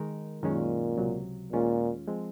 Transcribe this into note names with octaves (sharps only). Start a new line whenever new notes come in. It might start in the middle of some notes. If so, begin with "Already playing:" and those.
Already playing: D#3 G#3 D#4 A#4
F#2 A#2 D#3 G#3 C#4
C#2 C3 F#3
D#2 A#2 D#3 G#3 C#4 F4
F3 G#3 C4